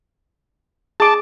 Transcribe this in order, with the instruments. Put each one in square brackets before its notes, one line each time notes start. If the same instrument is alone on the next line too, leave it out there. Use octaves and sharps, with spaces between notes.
[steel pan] G#4 D6 [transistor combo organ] A5